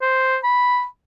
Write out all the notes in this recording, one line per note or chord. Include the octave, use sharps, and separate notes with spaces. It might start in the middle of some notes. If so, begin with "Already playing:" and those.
C5
B5